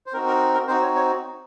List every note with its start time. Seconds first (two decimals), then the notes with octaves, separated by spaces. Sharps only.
0.06 C5
0.13 C4 D#4 F#4 A#4
0.27 A#4
0.54 A#4
0.67 C4 D#4 F#4 C5
0.82 C#5
0.95 C#5